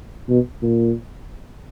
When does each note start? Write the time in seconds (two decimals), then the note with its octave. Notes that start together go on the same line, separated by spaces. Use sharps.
0.29 B2
0.62 A#2